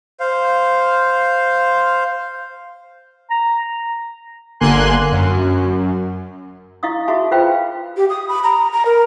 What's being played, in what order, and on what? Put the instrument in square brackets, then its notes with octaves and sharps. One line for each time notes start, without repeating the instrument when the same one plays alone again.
[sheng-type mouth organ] C5 F5
[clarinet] A#5
[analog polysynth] G1 D3 A#3 G#5 C6 F#6
F#2
[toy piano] E4 D#5 F5 C#6 D#6
F#4 G#4 E5 A5 B5 C#6
F4 B4 C5 F5 G5 B5
[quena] G4
D#6
B5
A#5
A#5
A#4